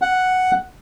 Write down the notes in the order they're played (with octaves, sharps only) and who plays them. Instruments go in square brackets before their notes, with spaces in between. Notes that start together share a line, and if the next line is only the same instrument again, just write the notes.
[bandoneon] F#5